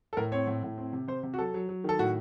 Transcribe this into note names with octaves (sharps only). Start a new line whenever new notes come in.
A4
A2 A#4
C4 C#5
A2
A2
C4
C3
C3 C5
C3
F#4
F#3 A4
F#3
F#3
D#3 A4
A2 F#4